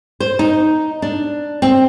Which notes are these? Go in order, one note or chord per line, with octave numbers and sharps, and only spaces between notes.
C5
D#4
D4
C4